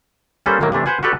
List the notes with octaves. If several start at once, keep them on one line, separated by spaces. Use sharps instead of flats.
G3 A#3 C#4 A4 B4 C5
A2 D#3 F#3 A#3
C3 E3 A3 D4
B4 C5 F#5 G#5
F#4 G4 A4 B4 D5